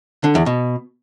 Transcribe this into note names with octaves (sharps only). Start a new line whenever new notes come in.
D3
E2
B2